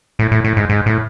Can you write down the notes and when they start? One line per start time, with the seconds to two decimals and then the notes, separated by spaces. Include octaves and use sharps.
0.19 A2
0.31 A2
0.45 A2
0.57 G#2
0.70 G#2
0.86 A2